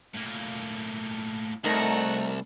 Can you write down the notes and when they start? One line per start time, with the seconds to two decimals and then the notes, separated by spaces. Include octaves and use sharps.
0.14 A2 A#3
1.64 C2 A3 D#4 F#4 A#4 D#5